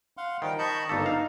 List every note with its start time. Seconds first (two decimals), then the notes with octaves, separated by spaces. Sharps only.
0.17 F5 F#5 C6
0.42 D#3 F3 G3 G5
0.58 D#5 A5 B5 C#6 G6
0.89 G1 G2 A#3 D4 D#4 A4
1.06 D#4 F5